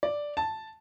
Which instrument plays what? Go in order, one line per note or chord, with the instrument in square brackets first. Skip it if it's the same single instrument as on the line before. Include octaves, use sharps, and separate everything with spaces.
[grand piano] D5
A5